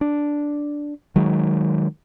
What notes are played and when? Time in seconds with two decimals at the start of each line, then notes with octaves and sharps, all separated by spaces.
0.01 D4
1.16 D#3 F#3 G#3